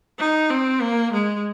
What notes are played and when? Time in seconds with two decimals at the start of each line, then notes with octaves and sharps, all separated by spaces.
0.19 D#4
0.50 C4
0.82 A#3
1.13 G#3